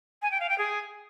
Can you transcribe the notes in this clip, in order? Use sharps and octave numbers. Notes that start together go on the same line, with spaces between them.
G#5
G5
F5
G5
G#4